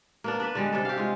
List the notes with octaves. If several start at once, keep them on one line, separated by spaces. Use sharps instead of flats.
A#3 B3 D4
D4 B4
D3 G3 G#3
C3 D4 A4
G4 F5
G#3 F4